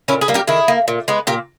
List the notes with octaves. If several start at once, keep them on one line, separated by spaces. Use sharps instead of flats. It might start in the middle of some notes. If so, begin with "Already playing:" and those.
A#2 C#4 E4
G#4 B4
G3 A#3
G4 A#4
D#3 E4 G#4
A#3
A#2
G#3 B3
A#2 G4 A#4